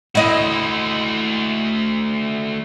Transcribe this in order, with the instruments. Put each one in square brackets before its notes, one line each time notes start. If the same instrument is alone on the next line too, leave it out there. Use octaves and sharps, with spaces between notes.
[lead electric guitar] A3 F#4 [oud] E4 D#5